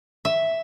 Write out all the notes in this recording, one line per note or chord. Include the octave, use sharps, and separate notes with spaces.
E5